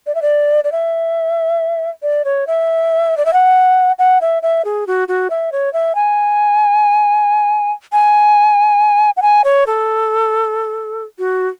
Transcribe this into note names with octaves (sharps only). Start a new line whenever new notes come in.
D5
E5
D5
D5
E5
D5
C#5
E5
D5
E5
F#5
F#5
E5
E5
G#4
F#4
F#4
E5
C#5
E5
G#5
G#5
F#5
G#5
C#5
A4
F#4